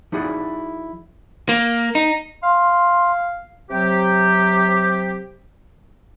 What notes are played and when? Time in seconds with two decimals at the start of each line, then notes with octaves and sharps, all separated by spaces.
0.12 F3 D#4 E4 F#4 G#4 D5
1.49 A#3
1.95 D#4
2.43 F5 C6
3.71 C3 F#3 G4